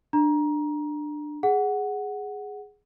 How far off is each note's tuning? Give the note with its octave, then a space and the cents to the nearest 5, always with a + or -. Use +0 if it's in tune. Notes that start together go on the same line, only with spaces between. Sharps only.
D4 +20 A#5 +20
G#4 +0 F#5 +0